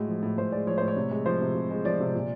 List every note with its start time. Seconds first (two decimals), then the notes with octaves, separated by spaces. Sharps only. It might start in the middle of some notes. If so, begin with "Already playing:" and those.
Already playing: A2 G#3 F#4
0.08 F3
0.23 A2
0.38 A2 C5
0.52 G#3 D5
0.66 F3 C#5
0.78 A2 C5
0.88 C#5
0.97 C3
1.11 G#3
1.26 F3 C5
1.41 C3
1.55 C3
1.71 G#3
1.85 F3 D5
2.00 C3
2.14 A#2